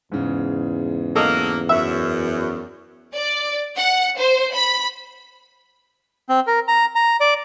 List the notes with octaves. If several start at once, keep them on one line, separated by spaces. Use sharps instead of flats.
E2 G#2 C#3
F#3 A#3 A4 D#5
F#2 E5
D5
F#5
C5
B5
C4
A#4
A#5
A#5
D5